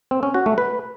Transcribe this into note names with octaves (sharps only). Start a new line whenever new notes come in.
C4
C#4
F#4
A3
B4